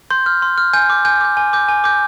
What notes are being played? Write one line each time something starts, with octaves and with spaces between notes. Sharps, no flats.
C6 G6
F6
C6
F6
G#5 G6
D6 G6
G#5 G6
D6 G6
G#5
D6 G6
G#5
D6 G6